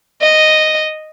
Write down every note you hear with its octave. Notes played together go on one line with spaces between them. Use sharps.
D#5